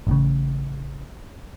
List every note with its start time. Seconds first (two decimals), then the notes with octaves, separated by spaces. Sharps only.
0.07 A1 A2 C#3